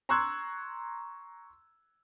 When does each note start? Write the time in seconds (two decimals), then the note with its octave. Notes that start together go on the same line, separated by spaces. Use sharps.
0.09 A#5 C6 C#6 E6 F#6 G#6